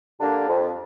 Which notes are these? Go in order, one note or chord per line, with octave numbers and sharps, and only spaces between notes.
D3 G3 A#3 D4
F2